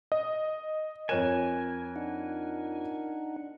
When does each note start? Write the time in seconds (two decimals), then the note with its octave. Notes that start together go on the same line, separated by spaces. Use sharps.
0.12 D#5
1.09 F2 A#4 C#5 G#5 F#6 E7
1.96 D4 D#4 F#5